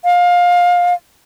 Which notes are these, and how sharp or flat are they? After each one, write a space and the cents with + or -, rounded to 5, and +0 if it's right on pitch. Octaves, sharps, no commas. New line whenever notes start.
F5 +20